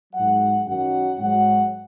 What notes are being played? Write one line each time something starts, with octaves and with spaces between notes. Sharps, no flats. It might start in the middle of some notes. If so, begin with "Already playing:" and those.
G#2 F#3 F#5
F#2 D#3 F#3 F#5
G#2 F#3 F#5